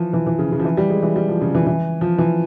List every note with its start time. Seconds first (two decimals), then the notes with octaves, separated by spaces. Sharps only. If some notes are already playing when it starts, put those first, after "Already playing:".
Already playing: E3 F3
0.13 E3
0.26 E3
0.39 C#3
0.52 C#3
0.60 F3
0.65 E3
0.77 G3
0.90 G#3
1.03 E3
1.16 G3
1.29 F3
1.41 C#3
1.55 E3
1.67 E3
2.01 F3
2.18 E3